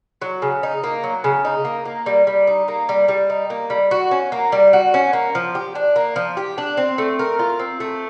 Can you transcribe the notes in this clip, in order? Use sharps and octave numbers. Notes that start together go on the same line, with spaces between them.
F#3
C#3
D#4
A#3
F#3
C#3
D#4
A#3
A#3
G3
G3
D#4
A#3
G3
G3
D#4
A#3
G3
F#4
C#4
A#3
G3
F#4
C#4
A#3
F3
G4
D4
A#3
F3
G4
D4
C4
A3
A#4
F4
C4
A3